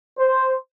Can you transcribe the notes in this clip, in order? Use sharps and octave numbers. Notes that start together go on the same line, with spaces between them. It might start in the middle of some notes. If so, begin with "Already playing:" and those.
C5